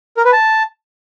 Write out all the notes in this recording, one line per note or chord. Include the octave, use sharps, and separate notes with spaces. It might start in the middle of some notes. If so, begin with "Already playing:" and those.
A#4
B4
A5